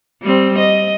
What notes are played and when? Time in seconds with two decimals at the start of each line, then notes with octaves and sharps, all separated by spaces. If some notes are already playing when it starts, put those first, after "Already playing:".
0.23 G3 C4
0.59 D#5